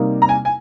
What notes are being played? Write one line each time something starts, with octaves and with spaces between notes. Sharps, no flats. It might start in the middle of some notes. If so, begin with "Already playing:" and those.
Already playing: C3 G3 A#3 D#4
A#5
G#5
G#5